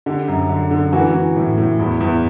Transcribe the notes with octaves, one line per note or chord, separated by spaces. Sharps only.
D3 G4
F#2
D3
D3
E3 F#4
E3
A2
A2
E2 E4
E2